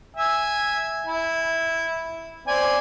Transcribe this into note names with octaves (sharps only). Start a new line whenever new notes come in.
E5 G#5 E6
E4
C4 D5 G#5